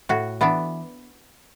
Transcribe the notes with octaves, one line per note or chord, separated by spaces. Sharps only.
A2 F#4
E3 B3 D4